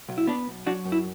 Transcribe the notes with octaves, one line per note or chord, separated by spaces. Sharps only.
B1
E4
B3 D4
B1
F#3 D4 F#4
F#2
E4